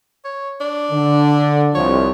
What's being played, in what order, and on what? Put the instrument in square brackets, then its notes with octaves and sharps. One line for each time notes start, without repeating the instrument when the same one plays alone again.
[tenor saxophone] C#5
D4
[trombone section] D3
[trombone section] C2 F3 [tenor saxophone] C#5